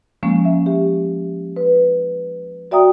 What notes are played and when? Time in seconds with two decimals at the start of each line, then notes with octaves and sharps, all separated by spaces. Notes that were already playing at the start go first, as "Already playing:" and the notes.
0.23 F3 G#3 A#3 C#4
0.45 E5
0.66 G4
1.56 B4
2.71 F#4 D5 E5 G5 A#5 D#6